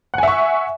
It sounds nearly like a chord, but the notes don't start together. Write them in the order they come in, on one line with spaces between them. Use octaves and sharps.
F#5 G#5 E5 C#6